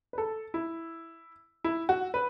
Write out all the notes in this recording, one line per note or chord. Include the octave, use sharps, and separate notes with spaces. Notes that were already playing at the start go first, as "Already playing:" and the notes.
B4
A4
E4
E4
F#4
B4